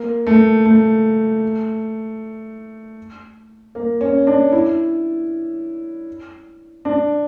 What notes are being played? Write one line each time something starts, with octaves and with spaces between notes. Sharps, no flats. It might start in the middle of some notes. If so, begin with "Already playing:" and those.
Already playing: A#3
A3
A3
A#3
C#4
D4
E4
D4